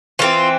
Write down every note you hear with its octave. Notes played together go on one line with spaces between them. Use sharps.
E3 A3 C4 F4